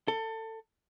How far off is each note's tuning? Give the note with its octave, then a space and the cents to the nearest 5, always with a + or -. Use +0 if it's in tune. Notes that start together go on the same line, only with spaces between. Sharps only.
A4 +25